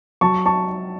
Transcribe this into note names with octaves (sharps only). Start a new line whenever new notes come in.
F#3 A5 C#6
A5 C#6